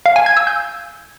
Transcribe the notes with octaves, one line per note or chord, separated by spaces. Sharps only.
F5
G#5
G#6
E6
G6